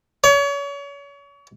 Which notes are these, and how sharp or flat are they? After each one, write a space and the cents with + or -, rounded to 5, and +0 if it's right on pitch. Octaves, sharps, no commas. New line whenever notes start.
C#5 +35